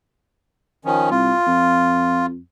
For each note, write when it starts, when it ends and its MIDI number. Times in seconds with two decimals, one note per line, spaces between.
0.85 1.09 51
0.85 1.09 53
0.85 1.09 61
1.10 1.33 36
1.10 2.26 65
1.47 2.39 41